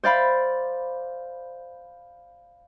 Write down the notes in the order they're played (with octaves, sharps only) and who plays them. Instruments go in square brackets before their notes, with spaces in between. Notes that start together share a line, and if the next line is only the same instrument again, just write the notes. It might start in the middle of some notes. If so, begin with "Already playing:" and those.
[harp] C5 D5 F5 B5